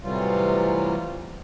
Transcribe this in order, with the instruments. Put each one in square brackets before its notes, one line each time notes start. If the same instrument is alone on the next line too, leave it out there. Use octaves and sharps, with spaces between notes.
[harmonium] A2 C3 E3 F#3 G3 F4